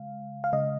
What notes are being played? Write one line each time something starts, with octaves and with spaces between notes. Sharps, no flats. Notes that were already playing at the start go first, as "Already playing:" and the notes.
Already playing: C#3 G#3 F5
F5
C#3 G#3 D#5